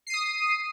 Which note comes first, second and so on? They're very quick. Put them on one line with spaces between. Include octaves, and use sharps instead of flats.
C7 D#7 D#6